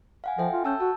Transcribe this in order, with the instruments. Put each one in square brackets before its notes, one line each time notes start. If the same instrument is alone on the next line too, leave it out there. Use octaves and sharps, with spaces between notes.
[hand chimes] F5 F#5 G#5
[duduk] F3 [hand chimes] A4 E5 G5
[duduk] F4
[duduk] C#4 [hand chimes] A5 E6 G6
[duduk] F#4 [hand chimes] A5